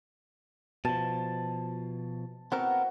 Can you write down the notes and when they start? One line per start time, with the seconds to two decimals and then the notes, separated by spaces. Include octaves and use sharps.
0.85 B2 F3 A5
2.52 B3 C4 F#4 A#4